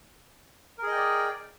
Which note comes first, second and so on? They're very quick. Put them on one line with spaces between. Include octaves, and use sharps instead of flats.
A#4 G#4 D#5 G5 D5